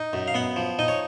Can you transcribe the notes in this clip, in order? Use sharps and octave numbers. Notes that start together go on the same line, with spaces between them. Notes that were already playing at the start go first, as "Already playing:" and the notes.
Already playing: D#4
F#2
F5
B3 F#5
F3
D#4 D#5
C#5